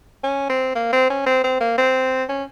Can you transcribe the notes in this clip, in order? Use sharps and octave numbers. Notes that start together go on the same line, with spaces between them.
C#4
C4
A#3
C4
C#4
C4
C4
A#3
C4
C#4